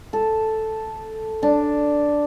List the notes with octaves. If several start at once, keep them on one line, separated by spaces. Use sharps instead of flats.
A4
D4